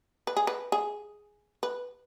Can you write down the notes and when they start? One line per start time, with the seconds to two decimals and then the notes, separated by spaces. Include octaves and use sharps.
0.27 B4
0.37 G#4
0.47 B4
0.72 G#4
1.63 B4